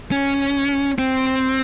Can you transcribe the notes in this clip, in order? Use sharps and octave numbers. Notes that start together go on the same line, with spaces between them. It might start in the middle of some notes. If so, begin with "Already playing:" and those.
C#4
C4